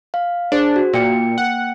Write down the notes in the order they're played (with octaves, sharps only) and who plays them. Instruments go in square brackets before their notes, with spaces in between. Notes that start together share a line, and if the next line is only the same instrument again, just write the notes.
[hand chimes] F5
[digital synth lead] D4 [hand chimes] G#4 C5
[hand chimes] F#4
[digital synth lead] A#2 [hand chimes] A#3 G5 C#7
[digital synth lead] F#5